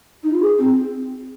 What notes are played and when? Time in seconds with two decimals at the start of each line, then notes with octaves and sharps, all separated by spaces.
0.24 D#4
0.33 F4
0.42 G#4
0.59 C4